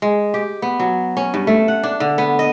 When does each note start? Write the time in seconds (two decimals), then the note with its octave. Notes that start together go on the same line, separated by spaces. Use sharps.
0.02 G#3
0.34 G4
0.62 B3
0.80 F#3
1.17 C#4
1.34 G2
1.47 A3
1.68 F#5
1.83 D4
2.00 D3
2.18 B3
2.39 D#5